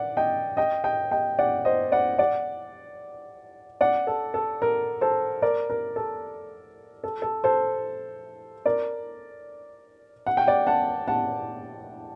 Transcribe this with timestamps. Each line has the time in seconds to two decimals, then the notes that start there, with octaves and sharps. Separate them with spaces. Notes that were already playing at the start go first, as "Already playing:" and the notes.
Already playing: D5 F#5
0.17 D#5 G5
0.57 D#5 G5
0.84 D#5 G5
1.11 D#5 G5
1.39 D5 F#5
1.65 C5 D#5
1.92 D5 F#5
2.18 D5 F#5
3.81 D5 F#5
4.07 A4
4.34 A4
4.62 A#4
5.01 A4 C5
5.42 A#4 D5
5.70 A#4
5.96 A4
7.04 A4
7.22 A4
7.44 A4 C5
8.66 A#4 D5
10.27 F#5
10.37 G5
10.47 D5 F#5
10.67 F#5 A5
11.08 F#5 A5